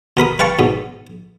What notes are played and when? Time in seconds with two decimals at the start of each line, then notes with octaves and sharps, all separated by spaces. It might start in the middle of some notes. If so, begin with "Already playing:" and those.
0.17 B2 A#4 B5 D#6
0.39 B4 F5 G5 A5 C#6
0.59 G#2 B2